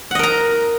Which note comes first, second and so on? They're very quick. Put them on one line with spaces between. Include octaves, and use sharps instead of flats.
F#5 D#5 A#4 A#5